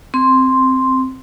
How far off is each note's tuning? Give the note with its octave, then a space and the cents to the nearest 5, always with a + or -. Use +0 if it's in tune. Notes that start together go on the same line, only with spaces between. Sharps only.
C4 +0 C6 +0